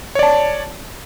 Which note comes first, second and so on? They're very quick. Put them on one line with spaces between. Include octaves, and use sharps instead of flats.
C#5 D5 A5